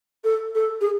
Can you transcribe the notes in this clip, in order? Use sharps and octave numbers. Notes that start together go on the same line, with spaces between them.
A4
A4
G#4